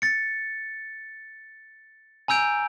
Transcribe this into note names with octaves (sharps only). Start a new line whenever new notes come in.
A6 C#7
G#5 A#5 E6 G6 D7